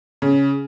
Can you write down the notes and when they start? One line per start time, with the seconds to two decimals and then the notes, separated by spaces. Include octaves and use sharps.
0.22 C#3